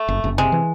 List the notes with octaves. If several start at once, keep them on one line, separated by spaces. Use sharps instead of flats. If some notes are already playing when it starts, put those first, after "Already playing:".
Already playing: A3
F#1
F#1
C3 G#3
E3